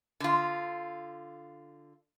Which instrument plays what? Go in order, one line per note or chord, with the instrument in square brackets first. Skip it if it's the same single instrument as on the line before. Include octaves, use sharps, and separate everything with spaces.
[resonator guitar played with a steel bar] D3 F4